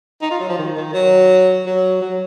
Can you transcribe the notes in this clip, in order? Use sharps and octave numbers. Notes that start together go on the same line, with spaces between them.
D#4
F4
F#3
F3
D#3
D#3
F#3
F#3
F#3